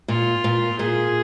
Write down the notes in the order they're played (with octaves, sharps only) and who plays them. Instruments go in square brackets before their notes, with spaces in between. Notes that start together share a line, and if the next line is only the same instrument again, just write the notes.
[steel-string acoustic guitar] A#2 [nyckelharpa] F4
[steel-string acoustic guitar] A#2
[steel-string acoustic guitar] A#2 [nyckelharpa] G#4